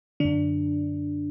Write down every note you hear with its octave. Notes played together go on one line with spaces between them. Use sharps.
F#2 D3 D4